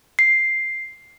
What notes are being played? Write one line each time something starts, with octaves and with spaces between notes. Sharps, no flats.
C7